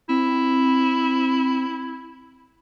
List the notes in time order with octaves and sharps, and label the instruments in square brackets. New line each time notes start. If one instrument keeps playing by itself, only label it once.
[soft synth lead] C4 [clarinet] E4